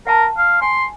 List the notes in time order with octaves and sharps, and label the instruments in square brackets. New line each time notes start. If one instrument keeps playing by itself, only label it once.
[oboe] A#4 [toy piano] F#5 A5
[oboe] F5
[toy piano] G#5 [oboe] C6